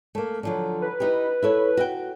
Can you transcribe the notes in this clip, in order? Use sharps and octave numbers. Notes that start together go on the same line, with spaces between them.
A3 A#3
D3 F3 F#3
B4
D#4 E4 G4
E4 A4 C#5
F#4 E5 G5